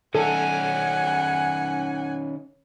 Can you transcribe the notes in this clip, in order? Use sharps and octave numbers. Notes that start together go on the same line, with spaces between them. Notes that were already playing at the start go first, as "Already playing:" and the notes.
D#3 C#4 A4 F#5 G#5